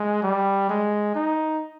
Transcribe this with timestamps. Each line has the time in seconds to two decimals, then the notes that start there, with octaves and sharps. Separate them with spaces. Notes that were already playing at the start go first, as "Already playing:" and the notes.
Already playing: G#3
0.23 G3
0.70 G#3
1.15 D#4